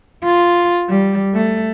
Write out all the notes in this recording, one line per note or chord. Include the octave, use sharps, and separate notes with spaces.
F4
G3
A3